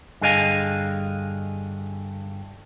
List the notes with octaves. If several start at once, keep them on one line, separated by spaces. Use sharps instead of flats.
G2 D3 G#4 D#5 F5 G#5